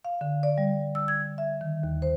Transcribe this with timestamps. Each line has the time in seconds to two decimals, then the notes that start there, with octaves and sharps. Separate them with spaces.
0.05 F5
0.21 D3
0.43 D5
0.58 G3
0.95 E6
1.08 G#6
1.38 E5
1.61 D#3
1.83 D#2
2.02 C5